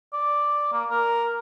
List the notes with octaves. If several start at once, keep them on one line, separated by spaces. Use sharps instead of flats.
D5
A#3
A#4